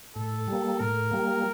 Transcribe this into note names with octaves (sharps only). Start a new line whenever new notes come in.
A2 A4
G3 A#3
A2 A#4
G3 A#3